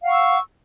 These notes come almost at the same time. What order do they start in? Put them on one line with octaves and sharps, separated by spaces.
F5 F#5 C#6 E6